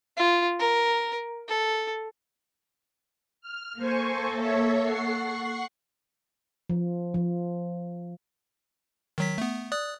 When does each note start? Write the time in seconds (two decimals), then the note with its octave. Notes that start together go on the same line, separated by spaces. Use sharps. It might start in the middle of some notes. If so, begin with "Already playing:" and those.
0.17 F4
0.60 A#4
1.49 A4
3.41 F6
3.78 A#3 A4 C5 G#5 C#6
4.35 C#5 E5
4.83 F#5 C#6 C7
6.69 F3
7.14 F3
9.18 D#3 F#3 B6
9.38 A3 B3
9.72 D5 D#6 F#6